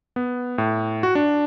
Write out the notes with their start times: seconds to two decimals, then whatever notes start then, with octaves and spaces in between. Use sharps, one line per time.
0.16 B3
0.58 A2
1.03 F#4
1.15 D4